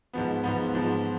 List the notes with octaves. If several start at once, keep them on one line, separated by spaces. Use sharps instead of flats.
G#2 F3 B3
G#2 F3 B3
G#2 F3 B3